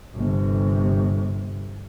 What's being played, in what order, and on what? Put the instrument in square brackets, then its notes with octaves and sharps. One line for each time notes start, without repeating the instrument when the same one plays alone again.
[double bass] G1 C3